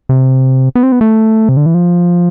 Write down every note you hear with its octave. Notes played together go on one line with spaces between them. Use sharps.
C3
B3
C4
B3
A3
C3
D3
E3
F3